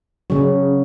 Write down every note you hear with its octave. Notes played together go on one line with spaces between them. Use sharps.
C#3 F#3 C#4